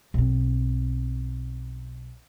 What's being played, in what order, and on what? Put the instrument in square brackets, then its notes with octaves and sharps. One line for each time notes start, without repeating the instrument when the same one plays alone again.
[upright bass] B1 C4